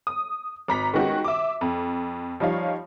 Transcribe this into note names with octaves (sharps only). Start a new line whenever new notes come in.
D#6
G#1 A#5 B6
D#3 G#3 B3 C#4 F#4 G4
E5 D6
F2
F3 G3 D#4 C#5 F5